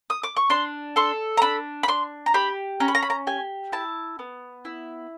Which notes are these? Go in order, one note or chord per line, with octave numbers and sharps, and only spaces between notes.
D#6
D6
C#6
D4 C6
A4 C6
A#5
D4 B5
B5
D4 C6
A#5
G4 B5
C#4 A#5
B5
A#5
B5
A#5
G4 G#5
E4 A5
B3
E4